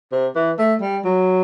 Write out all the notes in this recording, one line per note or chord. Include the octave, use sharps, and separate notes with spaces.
C3
E3
A3
G3
F#3